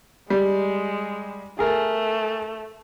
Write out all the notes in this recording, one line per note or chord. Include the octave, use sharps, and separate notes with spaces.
G3 G#3
A3 G#4 A#4